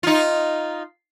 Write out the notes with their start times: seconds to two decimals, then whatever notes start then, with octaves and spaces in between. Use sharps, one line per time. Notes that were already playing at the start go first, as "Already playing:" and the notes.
0.03 D#4 F4